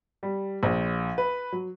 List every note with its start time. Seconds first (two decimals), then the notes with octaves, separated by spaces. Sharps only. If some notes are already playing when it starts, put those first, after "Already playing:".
0.23 G3
0.63 A#1
1.18 B4
1.52 F#3